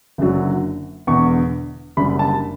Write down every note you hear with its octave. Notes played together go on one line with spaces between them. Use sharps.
F#1 F#2 D3 F#3
E1 E2 D3 C#6
F#1 F#2 D3 G3 B5
A5